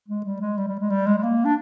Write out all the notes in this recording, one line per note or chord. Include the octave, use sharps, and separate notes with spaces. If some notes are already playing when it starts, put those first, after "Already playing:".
G#3
G3
G#3
G3
G3
G#3
G3
G#3
G#3
A#3
D4